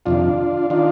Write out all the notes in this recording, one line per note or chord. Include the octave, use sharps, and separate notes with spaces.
F2 C3 D#3 D4 F4
D#3 D4 F4